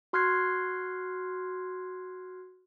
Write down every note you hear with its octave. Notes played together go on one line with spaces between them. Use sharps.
F#4 C6 F6 F#6 G#6 C7